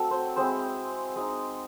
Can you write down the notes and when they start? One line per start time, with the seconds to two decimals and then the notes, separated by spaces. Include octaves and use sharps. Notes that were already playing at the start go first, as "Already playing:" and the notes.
Already playing: F#3 A3 C4 F#4 A4
0.11 C5
0.36 G#3 C4 E4 C5
1.16 G#3 D#4